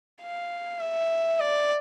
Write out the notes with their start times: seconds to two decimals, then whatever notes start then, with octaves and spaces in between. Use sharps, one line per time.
0.22 F5
0.80 E5
1.40 D5